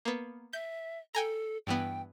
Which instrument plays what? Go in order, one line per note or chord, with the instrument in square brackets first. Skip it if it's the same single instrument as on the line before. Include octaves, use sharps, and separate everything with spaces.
[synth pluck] A#3 B3
[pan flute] E5 [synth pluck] G6
[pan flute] A4 [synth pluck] G5 G#5 A#5
[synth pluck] G2 E3 B3 [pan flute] G5